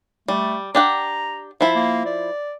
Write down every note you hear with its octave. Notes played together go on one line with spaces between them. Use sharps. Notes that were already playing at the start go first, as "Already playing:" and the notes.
G3 A3
D4 G4 F#5 A#5
F3 E4 E5
A#3
D5